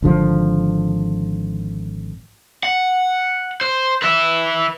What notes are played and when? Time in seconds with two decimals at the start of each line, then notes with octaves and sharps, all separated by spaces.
0.02 G#1 D3 F3
2.63 F#5
3.61 C5
4.02 B4 E5